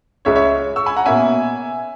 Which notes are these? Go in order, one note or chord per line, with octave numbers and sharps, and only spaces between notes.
C#2 C#3 G#3 C#4 C#5 E5
C#5 E5
C#6 E6
G#5 B5
F#5 A#5
B2 A#3 C#4 E5 G#5